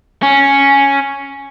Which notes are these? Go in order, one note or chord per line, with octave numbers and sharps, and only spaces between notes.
C#4